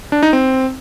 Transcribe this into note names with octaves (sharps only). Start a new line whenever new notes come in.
D4
D#4
C4